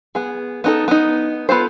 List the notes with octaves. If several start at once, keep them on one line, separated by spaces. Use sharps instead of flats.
B3 G#4
B3 D#4 A4
B3 D#4
B3 F4 A4 C5